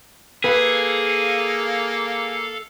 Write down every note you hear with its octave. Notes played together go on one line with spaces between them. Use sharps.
A#3 G#4 A4 B4 F5